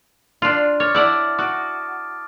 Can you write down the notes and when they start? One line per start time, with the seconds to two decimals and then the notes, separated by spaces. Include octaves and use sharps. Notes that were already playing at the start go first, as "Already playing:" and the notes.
0.42 D4 F4
0.80 C#5 D6 F6 A6
0.94 E4 D5 F#5 A5 D6 G6
1.38 F#4 D#6 D7